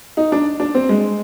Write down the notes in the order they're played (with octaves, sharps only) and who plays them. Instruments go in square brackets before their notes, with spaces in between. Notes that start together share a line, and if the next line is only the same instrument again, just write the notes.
[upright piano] D#4
D4
D4
C4
G#3